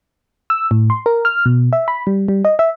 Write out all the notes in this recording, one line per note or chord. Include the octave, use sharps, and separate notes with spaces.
E6
A2
C6
A#4
F6
B2
E5
B5
G3
G3
D#5
E5